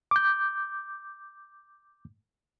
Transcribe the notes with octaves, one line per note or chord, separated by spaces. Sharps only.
D6 G6